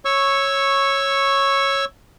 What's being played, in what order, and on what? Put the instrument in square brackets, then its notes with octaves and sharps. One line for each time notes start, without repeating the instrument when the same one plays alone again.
[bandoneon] C#5 C#6 E6